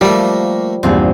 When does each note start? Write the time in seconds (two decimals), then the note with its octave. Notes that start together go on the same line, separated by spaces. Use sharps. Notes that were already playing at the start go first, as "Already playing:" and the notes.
0.01 F3 G3 A3 A#3
0.83 A#1 E2 G2 C4 F4 G#4